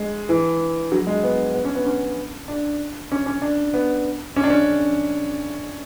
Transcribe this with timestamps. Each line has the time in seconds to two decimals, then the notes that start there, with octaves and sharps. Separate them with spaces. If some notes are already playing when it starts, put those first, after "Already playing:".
Already playing: G#3
0.29 E3
0.92 F#3
1.07 G#3
1.24 B3
1.54 B3
1.65 C#4
1.75 B3
1.86 C#4
2.48 D4
3.12 C#4
3.26 C#4
3.42 D4
3.74 B3
4.36 C#4
4.44 D4
4.50 C#4